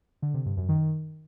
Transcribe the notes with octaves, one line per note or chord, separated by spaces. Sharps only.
D3
C3
G2
F#2
D#3